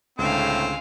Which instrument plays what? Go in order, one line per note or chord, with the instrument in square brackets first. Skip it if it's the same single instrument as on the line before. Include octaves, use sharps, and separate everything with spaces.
[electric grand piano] C#2 D3 [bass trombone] A2 [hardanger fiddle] G#3 F5 [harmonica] C4